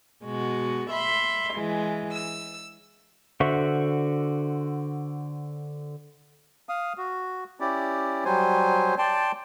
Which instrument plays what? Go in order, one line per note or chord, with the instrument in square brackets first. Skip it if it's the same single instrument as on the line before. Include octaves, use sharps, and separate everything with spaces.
[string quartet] B2 G#3 F#4
E5 B5 C6
E3 G#3
E6
[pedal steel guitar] D3 F#4 C5 E5 C#6
[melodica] F5 D#6
F#4
C#4 E4 G4 D5
F#3 G3 C5 G#5
D5 G5 A5 C6